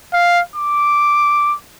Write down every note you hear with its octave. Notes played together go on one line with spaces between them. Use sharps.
F5
D6